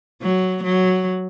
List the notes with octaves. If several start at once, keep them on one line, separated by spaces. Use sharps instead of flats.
F#3
F#3